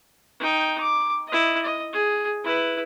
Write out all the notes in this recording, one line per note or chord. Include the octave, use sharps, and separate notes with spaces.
D#4 G5
D6
E4 D#5
D#5
G#4
E4 B4